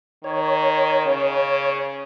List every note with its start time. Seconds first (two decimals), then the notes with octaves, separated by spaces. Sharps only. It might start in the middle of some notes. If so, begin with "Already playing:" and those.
0.24 D#3 C#5
1.06 C#3